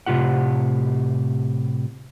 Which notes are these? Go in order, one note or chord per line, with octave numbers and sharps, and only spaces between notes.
A2 C3 F4 G4 F#5